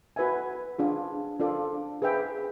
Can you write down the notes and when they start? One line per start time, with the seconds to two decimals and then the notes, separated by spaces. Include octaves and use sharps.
0.16 F#4 B4 E5 G#5
0.79 D4 F4 G#4
1.40 D4 F4 A4 D5
2.02 G#4 B4 E5 G5